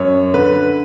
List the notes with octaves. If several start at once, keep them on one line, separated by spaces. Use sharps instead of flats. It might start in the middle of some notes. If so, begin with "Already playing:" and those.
Already playing: F#2 C#5
D3 B4